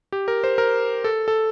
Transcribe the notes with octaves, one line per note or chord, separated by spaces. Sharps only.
G4
A#4
C5
A#4
A4
A4